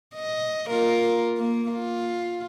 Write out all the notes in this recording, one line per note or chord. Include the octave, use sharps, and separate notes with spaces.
D#5
A#3 F4 A#4
A#3
F4